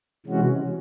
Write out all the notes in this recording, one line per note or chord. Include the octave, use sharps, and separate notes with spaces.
C3 E3 G#3 C#4 F#4